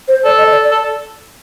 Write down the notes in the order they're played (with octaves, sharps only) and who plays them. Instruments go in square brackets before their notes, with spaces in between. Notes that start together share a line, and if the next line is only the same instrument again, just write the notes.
[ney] C5
[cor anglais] A4 [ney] D5
[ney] D#5
D5
D5
[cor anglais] A4